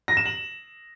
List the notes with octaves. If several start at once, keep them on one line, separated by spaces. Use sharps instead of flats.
A#6
E7
F#7